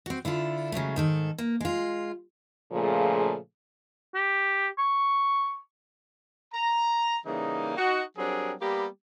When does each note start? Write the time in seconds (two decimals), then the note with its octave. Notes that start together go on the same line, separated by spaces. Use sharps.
0.06 C4 F#4
0.25 D3 E4 F4 A4
0.72 C#3 F#3 G#3 A3
0.96 G#2 D#3 A4
1.38 A#3
1.61 G#3 F4
2.71 A#2 C#3 F3 A3 G#4
4.15 G4
4.78 C#6
6.53 A#5
7.25 C#3 E3 G3 A#3 D#4
7.76 D#4 F#4
8.17 F#3 G3 C4 D4 G#4 A#4
8.61 G3 A#3 B3 G4 A#5 B5